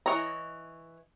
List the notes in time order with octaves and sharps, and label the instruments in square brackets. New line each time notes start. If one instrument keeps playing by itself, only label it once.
[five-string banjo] E3 D4 C#5 D#5 A#5